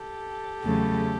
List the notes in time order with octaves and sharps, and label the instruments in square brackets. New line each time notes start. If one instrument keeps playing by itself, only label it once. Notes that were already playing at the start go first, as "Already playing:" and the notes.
Already playing: [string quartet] G4 A4
E2 C#3 F#3 A3